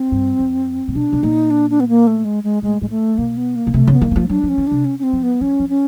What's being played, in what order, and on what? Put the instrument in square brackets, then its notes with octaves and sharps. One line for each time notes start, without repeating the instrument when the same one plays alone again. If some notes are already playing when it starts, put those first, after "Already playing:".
Already playing: [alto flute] C4
[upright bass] G2
F2
A#2
[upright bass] B2 [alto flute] D4
[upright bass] B2
[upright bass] A#2 [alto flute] D#4
[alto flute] D4
D4
B3
A#3
A3
G#3
G#3
[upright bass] A2 [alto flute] G#3
[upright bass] A2 [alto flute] G#3
[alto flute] A3
[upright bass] B2 [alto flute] A#3
[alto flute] B3
A#3
[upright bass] B2
[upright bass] C3 [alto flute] A3
[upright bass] C#3
[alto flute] B3
[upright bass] D#3 [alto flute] A#3
[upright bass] E3
F3
[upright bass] F#3 [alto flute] D4
[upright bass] F3
[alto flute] C#4
[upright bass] E3
[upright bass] C3 [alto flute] D4
[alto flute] C#4
C#4
C4
[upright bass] F3
[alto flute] B3
[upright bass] F3 [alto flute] C#4
[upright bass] F3
[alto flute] C#4